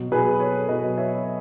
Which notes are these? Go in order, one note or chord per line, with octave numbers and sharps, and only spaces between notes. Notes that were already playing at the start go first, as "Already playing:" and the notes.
Already playing: B2 F#3
G#4 B4
A4 C#5
B2 F#3 B4 D#5
C#5 E5